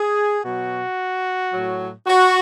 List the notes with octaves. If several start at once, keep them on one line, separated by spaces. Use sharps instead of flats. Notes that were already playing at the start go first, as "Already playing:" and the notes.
Already playing: G#4
B2 F#3 F#4
A2 F#3
F#4